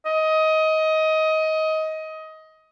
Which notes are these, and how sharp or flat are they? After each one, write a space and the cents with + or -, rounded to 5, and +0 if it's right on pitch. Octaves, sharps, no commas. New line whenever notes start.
D#5 +20